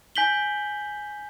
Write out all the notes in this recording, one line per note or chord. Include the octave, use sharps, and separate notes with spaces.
G#5 G6 B6 F#7 G7